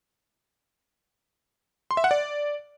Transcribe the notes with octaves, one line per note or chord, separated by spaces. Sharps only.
C6
E5
F#5
D5